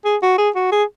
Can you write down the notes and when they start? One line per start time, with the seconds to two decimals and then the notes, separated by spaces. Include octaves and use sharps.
0.05 G#4
0.22 F#4
0.38 G#4
0.56 F#4
0.72 G#4